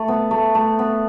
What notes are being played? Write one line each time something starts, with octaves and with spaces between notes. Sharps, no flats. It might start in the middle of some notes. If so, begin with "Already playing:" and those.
Already playing: A3
B3
A3
A3
B3